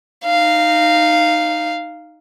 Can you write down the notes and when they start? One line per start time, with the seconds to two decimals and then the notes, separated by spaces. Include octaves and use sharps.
0.24 D#4 F5